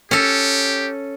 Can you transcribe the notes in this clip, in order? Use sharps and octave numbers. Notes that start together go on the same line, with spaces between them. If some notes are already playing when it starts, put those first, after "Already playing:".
C#4 G4 A4